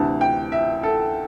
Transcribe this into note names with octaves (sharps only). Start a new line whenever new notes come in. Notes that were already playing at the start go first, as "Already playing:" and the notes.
Already playing: D2 C3 E3 A5
G5
E5
A4